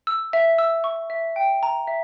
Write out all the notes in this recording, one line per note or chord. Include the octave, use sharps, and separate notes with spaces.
E6
E5
E6
C#6
E5
G5
A#5
E5